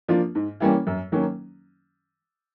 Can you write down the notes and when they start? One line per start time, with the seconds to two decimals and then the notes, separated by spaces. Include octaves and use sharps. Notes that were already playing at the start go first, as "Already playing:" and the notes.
0.08 F3 A#3 D4 F4
0.35 G#2
0.60 E3 G3 A#3 C#4
0.87 F#2
1.12 D#3 F#3 A#3 C#4